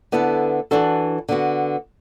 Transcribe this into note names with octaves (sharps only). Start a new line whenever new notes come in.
D3 B3 E4 A4
E3 D4 F#4 A4
D3 B3 F#4